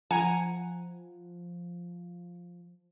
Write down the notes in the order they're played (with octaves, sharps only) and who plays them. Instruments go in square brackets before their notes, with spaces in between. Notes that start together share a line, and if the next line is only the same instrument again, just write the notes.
[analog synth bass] F3 [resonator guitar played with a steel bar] F#5 A#5 [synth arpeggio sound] G#5